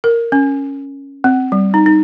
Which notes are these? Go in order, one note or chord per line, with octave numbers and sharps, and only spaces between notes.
A#4
C#4
C4
G3
D#4
D#4